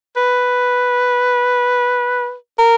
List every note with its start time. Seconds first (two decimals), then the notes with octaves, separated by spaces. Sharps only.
0.16 B4
2.58 A#4